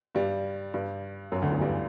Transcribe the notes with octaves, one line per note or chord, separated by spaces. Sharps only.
G2 G3
G2 G3
F#2 F#3
D2 D3
E2 E3
G2 G3